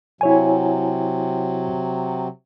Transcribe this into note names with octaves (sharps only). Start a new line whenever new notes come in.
C3 F#3 E4 C#5 G#5